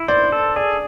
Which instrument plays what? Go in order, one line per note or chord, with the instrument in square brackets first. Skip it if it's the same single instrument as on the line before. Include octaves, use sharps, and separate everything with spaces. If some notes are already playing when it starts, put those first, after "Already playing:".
Already playing: [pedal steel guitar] E4
[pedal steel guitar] C5 [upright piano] D5
[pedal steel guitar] A4
[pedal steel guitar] G#4 [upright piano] D5